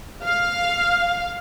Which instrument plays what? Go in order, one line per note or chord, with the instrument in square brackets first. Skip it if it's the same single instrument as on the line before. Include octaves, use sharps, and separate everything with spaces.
[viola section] F5